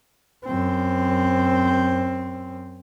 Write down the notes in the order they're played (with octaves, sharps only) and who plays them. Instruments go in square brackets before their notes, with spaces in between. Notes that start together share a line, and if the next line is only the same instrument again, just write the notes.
[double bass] F#2 C4